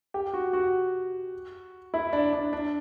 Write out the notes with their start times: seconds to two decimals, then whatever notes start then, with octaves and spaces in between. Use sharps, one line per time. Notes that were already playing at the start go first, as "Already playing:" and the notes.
0.14 G4
0.34 F#4
0.53 F#4
1.94 E4
2.13 D4
2.33 D4
2.53 D4